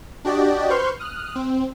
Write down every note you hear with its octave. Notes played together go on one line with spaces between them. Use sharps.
D4 F#4 G4 D5 D#5
B4 C5 C6 C#6 F6 G6
D#6 F6 F#6
C4